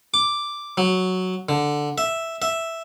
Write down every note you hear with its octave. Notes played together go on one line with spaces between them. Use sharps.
D6
F#3
D3
E5
E5